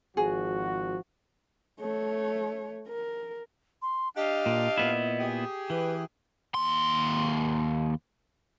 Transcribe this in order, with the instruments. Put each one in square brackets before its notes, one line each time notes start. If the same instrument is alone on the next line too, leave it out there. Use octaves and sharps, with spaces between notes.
[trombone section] G#1 F3 F#4 [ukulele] G#4
[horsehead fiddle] A3 C#5
A#4
[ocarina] C6
[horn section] D4 G4 F5 [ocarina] D#5
[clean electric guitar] A#2
A#2 B3 E4
[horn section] G4 G#4
[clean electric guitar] E3 [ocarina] B4
[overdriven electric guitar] D#2 C6